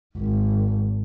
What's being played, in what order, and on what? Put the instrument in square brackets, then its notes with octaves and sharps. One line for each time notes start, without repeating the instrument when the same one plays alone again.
[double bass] G#1